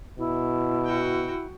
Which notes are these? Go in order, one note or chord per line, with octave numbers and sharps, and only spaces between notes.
B2 E4
F#4 G5